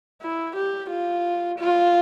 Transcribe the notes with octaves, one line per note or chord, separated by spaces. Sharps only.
E4
G4
F4
F4